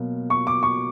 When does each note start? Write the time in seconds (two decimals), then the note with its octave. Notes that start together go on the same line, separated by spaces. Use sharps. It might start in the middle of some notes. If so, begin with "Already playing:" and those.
Already playing: B2 F#3 A#3
0.30 C#6
0.47 D6
0.63 C#6